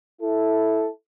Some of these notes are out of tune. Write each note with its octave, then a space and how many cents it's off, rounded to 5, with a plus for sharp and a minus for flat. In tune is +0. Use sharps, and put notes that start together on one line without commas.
E4 -5 A4 -5